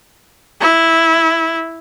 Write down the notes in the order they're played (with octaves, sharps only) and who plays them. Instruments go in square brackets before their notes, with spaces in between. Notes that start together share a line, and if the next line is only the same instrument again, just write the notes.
[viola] E4